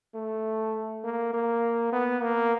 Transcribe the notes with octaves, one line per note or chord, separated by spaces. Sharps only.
A3
A#3
A#3
B3
A#3